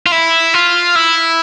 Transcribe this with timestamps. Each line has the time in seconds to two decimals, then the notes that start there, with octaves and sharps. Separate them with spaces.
0.06 F4
0.12 E4
0.54 F4
0.96 E4